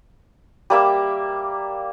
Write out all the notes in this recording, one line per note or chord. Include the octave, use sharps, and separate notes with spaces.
G3 A#3 E5